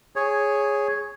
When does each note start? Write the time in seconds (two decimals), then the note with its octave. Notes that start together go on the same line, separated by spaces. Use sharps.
0.16 G#4 C#5